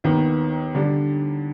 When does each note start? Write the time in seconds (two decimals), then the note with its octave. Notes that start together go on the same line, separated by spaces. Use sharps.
0.04 D#2 D#3 B3
0.75 D3 G3 D4